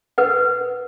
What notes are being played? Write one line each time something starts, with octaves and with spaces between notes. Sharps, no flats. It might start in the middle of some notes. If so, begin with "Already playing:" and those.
A#4 B4 F#5